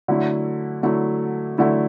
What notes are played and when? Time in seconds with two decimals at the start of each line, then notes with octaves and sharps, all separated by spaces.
0.08 D3 F#3 A3 E4
0.83 D3 F#3 A3 E4
1.58 D3 F#3 A3 E4